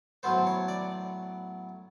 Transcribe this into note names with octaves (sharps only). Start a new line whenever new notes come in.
A2 F#3 B3 C5
C#5
D5